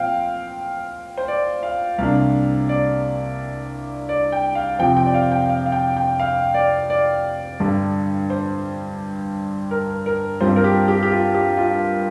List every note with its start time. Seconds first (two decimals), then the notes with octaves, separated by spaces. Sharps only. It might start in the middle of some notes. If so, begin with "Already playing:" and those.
Already playing: A#2 F3 C4 F5 G5
1.17 C5
1.28 D5
1.63 F5
1.98 C2 C3 A#3 D4 F5
2.69 D5
4.09 D5
4.32 G5
4.55 F5
4.79 F2 C3 F3 C4 G5
4.97 G5
5.06 D5
5.14 F5
5.32 G5
5.49 F5
5.66 F5
5.72 G5
5.97 G5
6.20 F5
6.54 D5
6.90 D5
7.60 G2 D3 G3
8.30 C5
9.71 A#4
10.06 A#4
10.41 G2 G3 C4 F4 C5
10.56 A#4
10.64 G4
10.88 G4
11.03 G4
11.11 F4
11.34 G4
11.57 F4